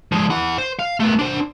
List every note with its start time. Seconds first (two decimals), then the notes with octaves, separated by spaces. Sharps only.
0.12 F3 G#3
0.30 E4 F#5
0.58 C5
0.79 F5
1.00 A3 B3
1.19 D4 C5